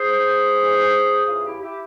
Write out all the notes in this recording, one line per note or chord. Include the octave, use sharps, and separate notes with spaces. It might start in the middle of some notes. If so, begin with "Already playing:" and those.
Already playing: G#4 C5
E2 E3
E2 C#3 E3 F4 G#4
E4 G4
E4 G4